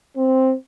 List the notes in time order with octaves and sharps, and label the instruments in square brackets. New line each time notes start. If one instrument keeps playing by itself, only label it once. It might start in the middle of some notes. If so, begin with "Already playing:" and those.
[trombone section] C4